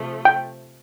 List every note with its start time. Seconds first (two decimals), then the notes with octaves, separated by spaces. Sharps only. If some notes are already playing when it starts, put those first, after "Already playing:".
Already playing: C3 F3 A3
0.25 G5